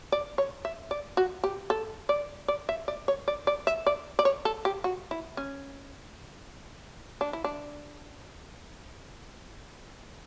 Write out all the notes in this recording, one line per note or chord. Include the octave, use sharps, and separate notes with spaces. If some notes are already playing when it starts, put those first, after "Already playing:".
D5
C#5
E5
D5
F#4
G4
A4
D5
D5
E5
D5
C#5
D5
D5
E5
D5
D5
C#5
A4
G4
F#4
E4
C#4
D4
E4
D4